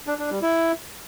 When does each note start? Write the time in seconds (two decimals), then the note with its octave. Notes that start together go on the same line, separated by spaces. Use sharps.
0.07 D4
0.19 D4
0.30 G3
0.42 E4